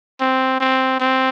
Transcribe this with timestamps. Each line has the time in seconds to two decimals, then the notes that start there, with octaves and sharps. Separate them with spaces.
0.21 C4
0.60 C4
1.00 C4